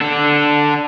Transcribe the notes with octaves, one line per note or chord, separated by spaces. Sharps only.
D4 A4